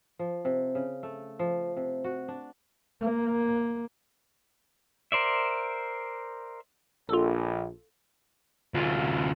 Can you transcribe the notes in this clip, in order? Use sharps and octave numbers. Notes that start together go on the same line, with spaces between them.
F3
C3
C#3
A3
F3
C3
F#4
D4
A#3
A#4 C5 D5 E5
A#1 F4 A4
D2 F4